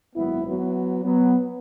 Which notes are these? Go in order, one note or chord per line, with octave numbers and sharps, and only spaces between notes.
G#1 F#2 F#3 B3 E4
F#3 B3
F#3 B3